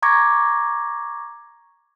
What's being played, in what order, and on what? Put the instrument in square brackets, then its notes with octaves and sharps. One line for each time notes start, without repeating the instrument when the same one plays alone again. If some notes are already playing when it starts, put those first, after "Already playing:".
[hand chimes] A#5 C#6 D6 G#6 A#6